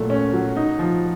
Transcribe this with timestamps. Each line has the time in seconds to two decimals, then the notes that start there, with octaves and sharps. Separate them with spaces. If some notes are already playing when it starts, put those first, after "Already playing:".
Already playing: A#2 F#3 A3
0.10 C#4
0.33 F#3
0.57 D#4
0.79 F3